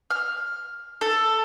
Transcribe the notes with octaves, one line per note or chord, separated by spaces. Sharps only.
F6
A4